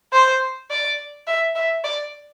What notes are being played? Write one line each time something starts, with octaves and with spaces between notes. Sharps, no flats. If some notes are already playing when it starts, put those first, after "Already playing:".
C5
D5
E5
E5
D5